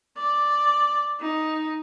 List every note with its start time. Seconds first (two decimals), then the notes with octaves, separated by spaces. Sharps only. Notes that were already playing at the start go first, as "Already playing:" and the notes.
0.17 D5
1.20 D#4